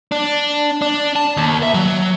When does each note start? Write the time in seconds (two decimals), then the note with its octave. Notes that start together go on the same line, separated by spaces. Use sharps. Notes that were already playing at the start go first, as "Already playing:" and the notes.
0.12 D4
0.82 D4
1.16 A5
1.37 D#2
1.63 E5
1.74 F#3